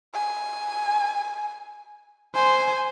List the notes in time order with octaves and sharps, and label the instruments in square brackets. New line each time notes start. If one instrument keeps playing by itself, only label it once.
[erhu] G#5
[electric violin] C5 [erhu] G#5